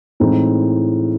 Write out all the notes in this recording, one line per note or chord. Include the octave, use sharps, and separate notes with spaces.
A2 E3 G#3 C4 D#4